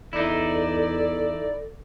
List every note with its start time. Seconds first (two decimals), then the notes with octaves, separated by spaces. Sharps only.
0.13 E2 D#4 E4 A4 D5